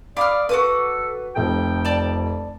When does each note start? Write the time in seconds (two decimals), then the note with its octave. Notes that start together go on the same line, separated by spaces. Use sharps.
0.17 D5 F5 B5 D6 D#6 F6
0.49 F#4 A4 B4 D6 D#6
1.36 F1 F2 G5
1.85 D5 A5